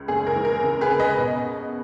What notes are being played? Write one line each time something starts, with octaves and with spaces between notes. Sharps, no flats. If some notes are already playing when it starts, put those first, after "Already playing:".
Already playing: C#2
F#1 G#4
A#4
E3
A#4
C#3 A#4
G#4 B4
C#3
B4 D#5
B2